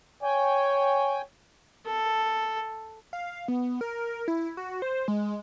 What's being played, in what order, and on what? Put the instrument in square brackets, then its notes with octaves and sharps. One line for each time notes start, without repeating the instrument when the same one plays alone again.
[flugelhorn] C#5 [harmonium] G5 G#5
[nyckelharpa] A4
[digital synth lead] F5
B3
A#4
E4
F#4
C5
G#3